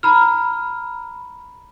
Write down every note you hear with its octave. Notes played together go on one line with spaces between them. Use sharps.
A#5 B5 F6